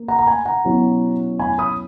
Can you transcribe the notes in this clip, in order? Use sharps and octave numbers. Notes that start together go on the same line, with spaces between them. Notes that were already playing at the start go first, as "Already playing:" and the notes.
Already playing: A#3
F#5 A#5
A#5
G#5 B5
F#5 A#5
B2 F#3 C#4 E4
G#5 B5
B5 D#6